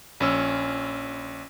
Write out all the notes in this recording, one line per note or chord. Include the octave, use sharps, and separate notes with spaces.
A#1 C#4 E6